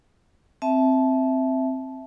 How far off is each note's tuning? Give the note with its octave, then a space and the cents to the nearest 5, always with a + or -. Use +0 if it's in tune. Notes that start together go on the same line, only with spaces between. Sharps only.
C4 +0 E5 +0 A5 -20